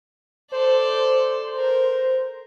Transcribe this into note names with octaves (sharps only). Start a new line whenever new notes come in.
A4 C5 D5
A#4